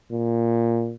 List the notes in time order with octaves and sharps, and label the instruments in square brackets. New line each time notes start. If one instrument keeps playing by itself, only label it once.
[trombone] A#2